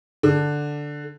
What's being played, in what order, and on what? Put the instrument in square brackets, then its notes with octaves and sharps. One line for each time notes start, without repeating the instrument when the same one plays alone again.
[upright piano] D3